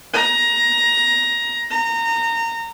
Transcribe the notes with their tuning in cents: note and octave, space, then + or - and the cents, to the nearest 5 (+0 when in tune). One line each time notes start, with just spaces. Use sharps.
A#5 +15
A#5 -25